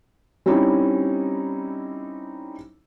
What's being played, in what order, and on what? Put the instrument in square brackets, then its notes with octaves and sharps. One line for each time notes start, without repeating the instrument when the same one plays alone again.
[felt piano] G3 C4 C#4 D#4 E4